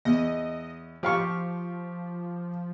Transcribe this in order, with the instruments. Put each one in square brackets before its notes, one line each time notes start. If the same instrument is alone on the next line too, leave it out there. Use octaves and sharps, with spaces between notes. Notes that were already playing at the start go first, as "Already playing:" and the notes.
[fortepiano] E2 [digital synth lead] D#5
[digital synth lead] F3 [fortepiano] G4 F5 C#6